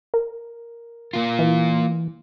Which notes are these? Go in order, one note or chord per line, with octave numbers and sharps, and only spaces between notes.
A#4
A#3 F4
E3